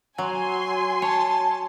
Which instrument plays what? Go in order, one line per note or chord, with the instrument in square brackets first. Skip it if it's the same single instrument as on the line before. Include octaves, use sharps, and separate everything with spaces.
[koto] F#3 [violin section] G#5 C6
[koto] C#5 [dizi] A5